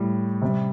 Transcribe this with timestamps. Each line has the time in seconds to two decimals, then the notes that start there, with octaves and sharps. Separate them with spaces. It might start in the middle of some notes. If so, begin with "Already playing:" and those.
Already playing: A2 G3
0.41 C3 G3